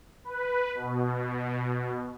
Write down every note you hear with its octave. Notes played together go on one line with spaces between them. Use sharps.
B4
B2